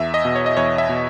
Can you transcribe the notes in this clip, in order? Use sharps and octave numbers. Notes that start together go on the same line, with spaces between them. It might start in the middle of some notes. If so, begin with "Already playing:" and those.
Already playing: E2 E5
D#5
B2
C#5
D#5
E2 C#5
E5
B2